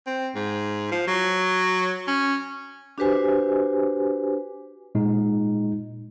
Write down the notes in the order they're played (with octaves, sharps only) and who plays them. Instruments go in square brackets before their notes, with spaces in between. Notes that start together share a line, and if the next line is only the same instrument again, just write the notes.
[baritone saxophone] C4
G#2
F3
F#3
C#4
[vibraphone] D4 F#4 G4 B4 C5 G#5
[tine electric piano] A#2 G#3 D#4